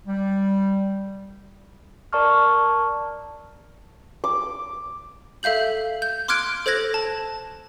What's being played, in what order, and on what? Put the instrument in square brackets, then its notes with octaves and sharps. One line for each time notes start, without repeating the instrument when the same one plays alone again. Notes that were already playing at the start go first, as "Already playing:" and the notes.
[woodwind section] G3
[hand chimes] A#4 D5 A5 C#6 F6
[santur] D6
[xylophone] A4 E5 F5 G6 F#7
G6
C6 D6 F6 F#6 G#6 D7
A4 C5 F#6 G#6 A#6
A5